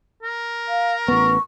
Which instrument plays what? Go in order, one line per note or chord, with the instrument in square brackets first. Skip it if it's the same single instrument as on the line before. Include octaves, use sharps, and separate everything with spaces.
[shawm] A#4
[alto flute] F5
[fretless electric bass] A1 B3 [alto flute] C#6